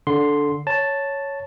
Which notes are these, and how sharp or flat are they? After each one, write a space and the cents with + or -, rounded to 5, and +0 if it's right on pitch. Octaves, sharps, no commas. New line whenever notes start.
D3 -10 C6 +0
C#5 +0 A5 +0